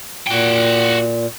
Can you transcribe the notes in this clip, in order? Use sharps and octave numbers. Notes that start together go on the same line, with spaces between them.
A#2 F#4 G5